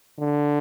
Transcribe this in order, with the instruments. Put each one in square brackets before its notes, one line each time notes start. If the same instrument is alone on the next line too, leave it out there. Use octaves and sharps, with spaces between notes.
[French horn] D3